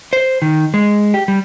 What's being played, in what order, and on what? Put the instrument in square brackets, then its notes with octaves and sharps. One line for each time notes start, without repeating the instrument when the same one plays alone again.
[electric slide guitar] C5
D#3
G#3
G4
G3